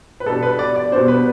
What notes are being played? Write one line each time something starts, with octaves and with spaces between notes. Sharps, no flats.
B4
B2 G3 B3 D4 A4
B4
D5
D5
B2 G3 B3 D4 C5
B4